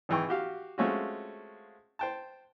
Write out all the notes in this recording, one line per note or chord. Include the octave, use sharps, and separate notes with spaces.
G#1 E3 G5 C#6
F#4 G4 F5
G#3 A3 C4 C#4 F4 F#4
C5 G5 A5